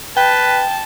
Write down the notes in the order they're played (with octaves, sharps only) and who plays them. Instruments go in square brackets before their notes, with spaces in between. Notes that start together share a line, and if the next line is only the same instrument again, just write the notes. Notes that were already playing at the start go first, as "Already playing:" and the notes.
[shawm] B4 [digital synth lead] G5 [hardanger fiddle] A5